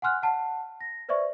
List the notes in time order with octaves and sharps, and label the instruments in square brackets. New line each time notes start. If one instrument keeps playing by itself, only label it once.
[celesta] F#5 G#5 C6 F6 F#6
F#5 A5 C7
A#6
B4 C5 D5 E5 C#6